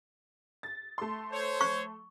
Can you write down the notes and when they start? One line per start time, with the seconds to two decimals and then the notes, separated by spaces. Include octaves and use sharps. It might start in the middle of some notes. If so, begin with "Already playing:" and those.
0.63 A6
0.98 A3 C6
1.32 C5 C#5
1.61 C#6